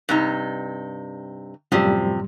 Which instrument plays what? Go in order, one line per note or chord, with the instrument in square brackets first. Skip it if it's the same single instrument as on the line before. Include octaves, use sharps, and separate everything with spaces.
[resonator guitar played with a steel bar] G2 C3 D#4
[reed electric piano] F#2 A2 G3 [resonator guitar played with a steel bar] C3 F3